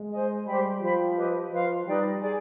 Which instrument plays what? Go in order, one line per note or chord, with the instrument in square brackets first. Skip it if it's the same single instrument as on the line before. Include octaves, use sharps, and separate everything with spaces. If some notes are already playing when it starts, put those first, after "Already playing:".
Already playing: [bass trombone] G#3
[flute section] C5 D#5 G#5
[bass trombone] G3 [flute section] G4 C5 G5 B5
[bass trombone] F3 [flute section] C5 G5 B5
[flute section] G4 B4 D#5
[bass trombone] F3 [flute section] B4 F5 C6
[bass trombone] G3 [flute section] D#4 B4 D5 G5
[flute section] G#4 D5 G#5